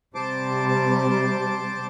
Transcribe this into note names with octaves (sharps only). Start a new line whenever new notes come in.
C3 G3 C5 A5 D6